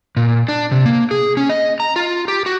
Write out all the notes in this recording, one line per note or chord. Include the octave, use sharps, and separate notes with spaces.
A#2
D4
C3
A#3
G#4
C#4
D#5
A#5
F4
G4
F#4